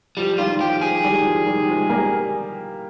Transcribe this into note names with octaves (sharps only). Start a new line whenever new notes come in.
F3 G3
D#3 G3 F4
F3 G4
F3 G#4
D#3 G3
F3
D#3 G3
F3 G#3
G3 A#3